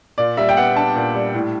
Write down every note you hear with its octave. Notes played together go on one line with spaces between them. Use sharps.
A#2 D5
G3 E5
G5
B3 F#5
D4 A5
A#2
G3
A2